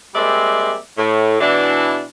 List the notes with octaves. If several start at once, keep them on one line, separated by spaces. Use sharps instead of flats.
G3 G#3 A#3 C4 D5 E5
A2
B2 E3 D4